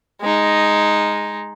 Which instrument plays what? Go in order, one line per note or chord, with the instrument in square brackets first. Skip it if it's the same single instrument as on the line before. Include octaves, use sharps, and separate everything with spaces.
[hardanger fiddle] G#3 D#4